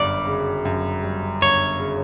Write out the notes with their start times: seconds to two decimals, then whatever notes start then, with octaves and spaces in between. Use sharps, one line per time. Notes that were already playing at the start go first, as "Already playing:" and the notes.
Already playing: G1 F#2 G3 D5
0.27 C#3
0.65 F#2
1.03 G3
1.42 G1 C#5
1.79 C#3